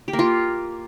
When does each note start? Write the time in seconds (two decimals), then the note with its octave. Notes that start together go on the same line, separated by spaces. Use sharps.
0.08 G4
0.13 A#3
0.19 F4